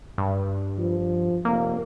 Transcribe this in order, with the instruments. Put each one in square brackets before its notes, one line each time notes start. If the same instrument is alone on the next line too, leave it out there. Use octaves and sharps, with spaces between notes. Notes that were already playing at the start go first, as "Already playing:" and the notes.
[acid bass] G2
[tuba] F3
[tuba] F1 [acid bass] A#3